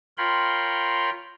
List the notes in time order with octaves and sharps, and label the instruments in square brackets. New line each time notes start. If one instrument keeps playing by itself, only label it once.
[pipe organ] F4 A#4 C#5 G5 B5 C6